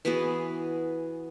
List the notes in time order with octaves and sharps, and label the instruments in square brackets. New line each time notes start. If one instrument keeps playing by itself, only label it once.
[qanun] E3 B3 F#4 G#4